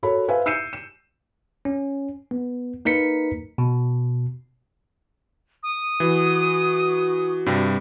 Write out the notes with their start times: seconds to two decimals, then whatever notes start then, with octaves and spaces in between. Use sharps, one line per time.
0.03 F#4 A4 A#4 C#5 B5
0.28 B4 C5 E5 F5 G#5
0.46 E6 G6 C7 C#7 D#7 E7
0.73 E7
1.65 C#4
2.31 B3
2.85 A#3 D#4 A#4 B4 B6 C#7
3.58 B2
5.63 D#6
6.00 E3 F#4
7.46 G2 C3 G3